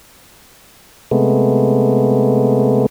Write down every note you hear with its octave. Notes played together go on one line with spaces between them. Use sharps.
C3 G#3 A3 B3